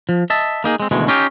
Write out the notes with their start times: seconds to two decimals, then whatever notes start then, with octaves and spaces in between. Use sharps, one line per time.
0.09 F3
0.30 D#5 E5 A5
0.64 A#3 D#4 G#4
0.80 G#3 C4
0.91 D2 B2 D#3 E3 G#3
1.08 C#4 D#4 F4 G4